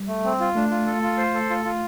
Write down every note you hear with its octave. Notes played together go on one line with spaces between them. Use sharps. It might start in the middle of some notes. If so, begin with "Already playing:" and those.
Already playing: G3
A3
C4
F4
A3 D4
F4
A4
F4
C5
A4
F4
F4